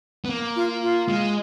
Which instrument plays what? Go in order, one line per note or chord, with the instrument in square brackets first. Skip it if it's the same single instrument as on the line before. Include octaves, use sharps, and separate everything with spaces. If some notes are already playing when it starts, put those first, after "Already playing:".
[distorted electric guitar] B3
A#3
[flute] F4
F4
[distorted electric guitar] G#3